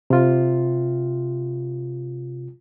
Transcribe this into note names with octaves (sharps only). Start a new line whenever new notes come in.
C3 F4